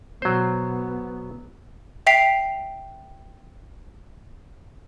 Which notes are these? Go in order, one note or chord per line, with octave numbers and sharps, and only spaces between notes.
B2 F#3 B3 C5
E5 G5 B6 C7 F7